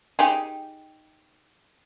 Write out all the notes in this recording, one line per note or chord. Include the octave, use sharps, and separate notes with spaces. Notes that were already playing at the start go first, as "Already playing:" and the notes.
D#4 G4 G#4